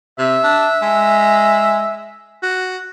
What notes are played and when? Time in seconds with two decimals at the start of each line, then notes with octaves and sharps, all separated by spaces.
0.19 C3 E5
0.44 D4
0.82 G#3
2.43 F#4